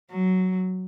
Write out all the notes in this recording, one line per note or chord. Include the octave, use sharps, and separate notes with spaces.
F#3